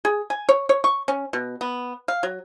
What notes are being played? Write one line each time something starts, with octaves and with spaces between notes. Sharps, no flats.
G#4
G#5
C#5
C#5
C#6
C#4
B2
B3
F5
F#3